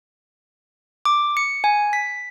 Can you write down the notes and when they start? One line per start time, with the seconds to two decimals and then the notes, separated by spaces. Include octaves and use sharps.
1.05 D6
1.37 C#7
1.64 G#5
1.93 B6